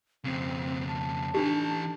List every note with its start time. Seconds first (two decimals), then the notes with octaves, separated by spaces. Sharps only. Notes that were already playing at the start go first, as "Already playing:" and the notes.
0.24 F2 C#3 C4
0.88 A5
1.34 E3 D4 D#4 G4 A4